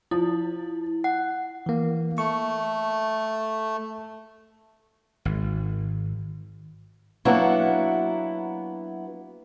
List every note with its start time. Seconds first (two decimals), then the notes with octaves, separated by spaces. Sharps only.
0.11 F3 E4
1.04 F#5
1.66 E3 A#3
2.18 A3 C#6
5.25 G#1
7.25 F#3 A#3 B3 D4 E4 F#4